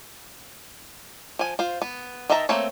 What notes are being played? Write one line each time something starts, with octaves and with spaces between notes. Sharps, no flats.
F3 G#5
F4 C5
B3
D#3 D#5 E5 A5 A#5
A3 A#3 C4 C#5